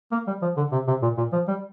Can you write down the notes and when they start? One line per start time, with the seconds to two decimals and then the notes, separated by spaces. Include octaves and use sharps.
0.12 A#3
0.27 G3
0.42 F3
0.57 D3
0.72 C3
0.88 C3
1.02 A#2
1.18 A#2
1.32 F3
1.48 G3